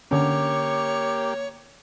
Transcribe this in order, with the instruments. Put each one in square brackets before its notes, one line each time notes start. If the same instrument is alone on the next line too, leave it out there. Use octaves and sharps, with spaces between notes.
[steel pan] D3 C#4 [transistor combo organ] A#3 G4 [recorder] C#5 [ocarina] D6